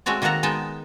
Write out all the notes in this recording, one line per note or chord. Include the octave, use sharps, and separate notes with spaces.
G#3 A3 C4 F#4 C#5 D5
D#3 A#3 F#4 A4 F#5 A#5
G#3 B3 D#4 G5 A5